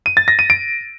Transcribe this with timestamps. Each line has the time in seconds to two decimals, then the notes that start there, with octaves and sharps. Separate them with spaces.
0.06 D#7
0.17 A6
0.28 A#6
0.39 D#7
0.50 D7